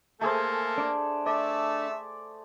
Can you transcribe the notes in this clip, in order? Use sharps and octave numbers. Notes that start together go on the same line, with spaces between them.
A3 A#3 G#4 A4 C5
D4
A3 D5 E5